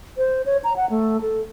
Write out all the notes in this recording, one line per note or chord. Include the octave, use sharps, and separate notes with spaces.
C5
C#5
A#5
F#5
A3
A4